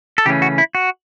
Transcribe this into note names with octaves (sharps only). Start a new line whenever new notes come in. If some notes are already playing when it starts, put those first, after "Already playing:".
A4
C#3 E3 A3 C#4 G4
F#4
E4
F#4